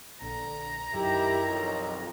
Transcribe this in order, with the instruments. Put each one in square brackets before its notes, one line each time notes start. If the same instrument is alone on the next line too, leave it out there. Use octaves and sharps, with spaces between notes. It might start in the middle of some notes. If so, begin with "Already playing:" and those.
[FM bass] A#1 [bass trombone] D3 [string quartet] A#5
[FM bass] F#2 [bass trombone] D#3 [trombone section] E4 G4
[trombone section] B1 F2